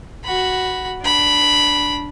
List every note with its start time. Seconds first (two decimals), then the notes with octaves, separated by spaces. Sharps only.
0.25 F#4 B5
1.02 D4 B5